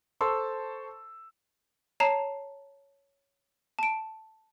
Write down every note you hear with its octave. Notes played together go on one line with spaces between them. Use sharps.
A4 C5 A5 C6 C#6 E6
C#5 A5 A#5 C7
A5 D7